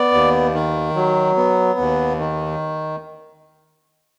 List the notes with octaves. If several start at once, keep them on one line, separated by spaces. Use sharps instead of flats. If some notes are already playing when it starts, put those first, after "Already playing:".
Already playing: B3 D5
D#2
D#3
F#3
B3
D#2
D#3